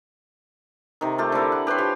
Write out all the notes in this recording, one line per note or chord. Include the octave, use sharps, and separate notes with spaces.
C3 D#3
A3 F4 G4
D3 C4 E4 A#4
F#5
G4 B4 C#5 C6
F3